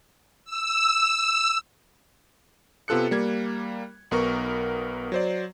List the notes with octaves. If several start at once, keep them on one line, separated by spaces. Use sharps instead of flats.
E6
C3 B3 F4 A4 F#6 C#7
G3 A#3 G#6
B1 B3 A#4 C#6
F#3 C5 D5